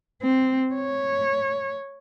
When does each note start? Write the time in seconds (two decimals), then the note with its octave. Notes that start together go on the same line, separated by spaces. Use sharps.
0.22 C4
0.74 C#5